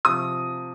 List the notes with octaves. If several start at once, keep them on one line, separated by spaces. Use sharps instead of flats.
C3 F3 C4 D#6